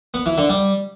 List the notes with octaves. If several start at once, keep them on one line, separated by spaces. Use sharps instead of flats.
B3
E3
D3
G3